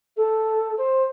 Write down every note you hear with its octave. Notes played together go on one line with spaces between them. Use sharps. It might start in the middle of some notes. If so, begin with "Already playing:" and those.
A4
C5